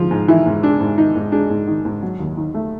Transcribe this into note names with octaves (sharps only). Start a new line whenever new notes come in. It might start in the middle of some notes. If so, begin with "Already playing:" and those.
Already playing: G#2 F3 G#3 F4
G#2
D#3 E3 E4
G#2
G#3 D4
G#2
D#3 D#4
G#2
G#3 D4
G#2
D#3
G#2
F#3
D#2
D#3
A3